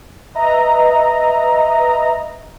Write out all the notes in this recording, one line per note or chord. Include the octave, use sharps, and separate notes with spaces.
B4 D#5 E5 A#5